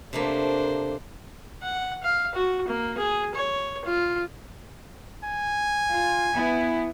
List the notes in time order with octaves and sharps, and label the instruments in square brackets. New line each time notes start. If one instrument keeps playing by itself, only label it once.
[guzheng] C3 A3 A#3 [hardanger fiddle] D4 C5
[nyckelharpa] F#5
F5
F#4
A#3
G#4
C#5
F4
[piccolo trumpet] G#5
[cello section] F4
B3 E4